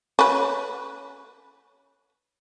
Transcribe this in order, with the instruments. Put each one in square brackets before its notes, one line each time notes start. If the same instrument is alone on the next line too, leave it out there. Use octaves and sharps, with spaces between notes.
[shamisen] C#4 B4